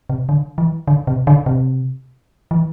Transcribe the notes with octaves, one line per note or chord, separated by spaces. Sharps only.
C3
D3
E3
D3
C3
D3
C3
E3